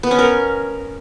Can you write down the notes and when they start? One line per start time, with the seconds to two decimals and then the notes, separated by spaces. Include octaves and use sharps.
0.03 B3
0.11 C#4
0.19 A#4